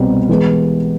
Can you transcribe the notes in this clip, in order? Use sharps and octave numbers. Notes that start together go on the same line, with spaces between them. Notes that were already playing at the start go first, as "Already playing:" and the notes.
Already playing: C2 B2 G3 C4
E3 G#3 B3